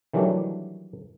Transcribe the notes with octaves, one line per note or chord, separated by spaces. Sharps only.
D#3 E3 F#3 G3 A3 D4